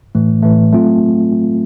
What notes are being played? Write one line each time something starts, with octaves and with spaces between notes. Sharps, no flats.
A2 E3 A3
A2 E3 A3
F#3 A3 C4 F4